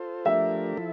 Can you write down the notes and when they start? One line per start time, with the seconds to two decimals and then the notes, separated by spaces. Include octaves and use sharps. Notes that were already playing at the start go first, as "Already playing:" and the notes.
Already playing: F4 A4 C5
0.25 F3 A3 D4 G4 A#4 E5
0.77 F3 E4 A4